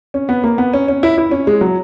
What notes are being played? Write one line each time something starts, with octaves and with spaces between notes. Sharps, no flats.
C#4
B3
A#3
B3
C#4
C#4
E4
E4
C#4
G#3
F#3